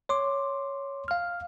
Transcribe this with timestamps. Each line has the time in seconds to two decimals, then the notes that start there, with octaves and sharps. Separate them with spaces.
0.09 C#5 C6 D6
1.08 F5 F6